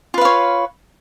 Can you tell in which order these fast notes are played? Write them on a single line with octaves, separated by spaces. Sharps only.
F4 B4 F5 C#5